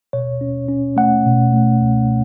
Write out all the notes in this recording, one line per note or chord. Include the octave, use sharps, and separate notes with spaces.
B2 C#5
C#4
C#4
A3 F#5
B2
A3
C#2